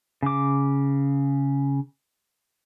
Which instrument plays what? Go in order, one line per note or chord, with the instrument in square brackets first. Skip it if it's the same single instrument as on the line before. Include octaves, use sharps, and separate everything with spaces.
[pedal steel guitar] C#3 D6